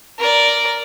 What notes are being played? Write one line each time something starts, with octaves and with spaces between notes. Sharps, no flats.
A#4 D5